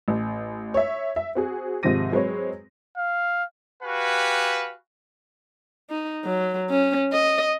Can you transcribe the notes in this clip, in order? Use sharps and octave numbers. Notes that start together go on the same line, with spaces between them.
A1
C#5 E5
E5
C4 F#4 G#4
G#2 C3 D#3 F3 A#6 D#7
F#3 G#3 C4 B4 C#5
F5
F#4 G4 B4 F5 G#5
D#4
F#3
C#4
D#5